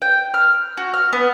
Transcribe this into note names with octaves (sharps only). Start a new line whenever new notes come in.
G5
F6
F#4
F6
B3